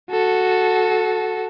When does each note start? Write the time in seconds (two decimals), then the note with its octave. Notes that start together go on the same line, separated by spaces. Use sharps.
0.11 F#4 A4